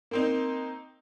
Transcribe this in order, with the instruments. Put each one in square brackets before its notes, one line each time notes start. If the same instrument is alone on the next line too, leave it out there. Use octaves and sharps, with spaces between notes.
[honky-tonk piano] A#3 C4 D#4